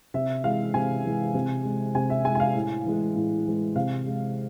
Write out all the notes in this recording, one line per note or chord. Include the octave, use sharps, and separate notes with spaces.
C3 E5
E3 G#3 F5
C3 G#5
E3 G#3
C3
G#3
C3 G#5
E5
G#3 G#5
G#5
F5
A2
E3 G#3
A2
E3 G#3
C3 F5
G#3